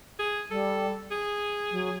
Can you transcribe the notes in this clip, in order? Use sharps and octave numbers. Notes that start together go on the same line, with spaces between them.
G#4
G3 A4
G#4
F#3